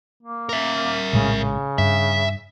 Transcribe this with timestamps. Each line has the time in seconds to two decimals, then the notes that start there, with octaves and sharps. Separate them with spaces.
0.23 A#3
0.49 A#4 E5
1.13 A#1 A2 C#3 G#3
1.36 C#3
1.78 G2 E5